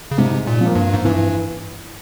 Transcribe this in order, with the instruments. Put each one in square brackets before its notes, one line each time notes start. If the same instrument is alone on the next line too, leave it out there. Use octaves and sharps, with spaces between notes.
[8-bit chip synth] C#3
[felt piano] G#2 [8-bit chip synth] C3
[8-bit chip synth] A#2
[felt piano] F3 A#3
[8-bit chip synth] G2
G#2
[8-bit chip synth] G2 [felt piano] E3